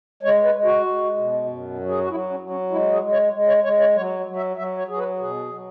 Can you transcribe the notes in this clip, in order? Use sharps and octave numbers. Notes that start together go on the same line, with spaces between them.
G#3 C#5
B4
G#3
F#4
G#3
B2
F#2
F#3
G#4
F#4
F#3 E4
C#4
F#3
C#4
G#3 E4
G#4
G#3
C#5
G#3
C#5
G#3 C#5
C#5
F#3 C#5
F#3
E5
F#3 E5
C#5
F#3 G#4
B4
B2 G#4
F#3